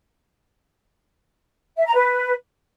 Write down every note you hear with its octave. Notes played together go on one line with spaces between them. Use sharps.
E5
A#5
B4